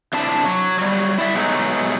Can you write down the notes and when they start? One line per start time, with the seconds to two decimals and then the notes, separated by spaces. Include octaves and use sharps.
0.13 C3 D4 E4 A5
0.45 F#3
0.79 F#3 G3
1.18 E4 D5 E5
1.34 B2 F#3 G#3 A3 D#4